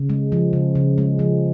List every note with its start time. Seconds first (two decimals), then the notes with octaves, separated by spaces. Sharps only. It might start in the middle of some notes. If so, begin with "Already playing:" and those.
Already playing: C#3
0.10 G#3
0.32 F3
0.53 C#3
0.75 C#3
0.98 G#3
1.19 F3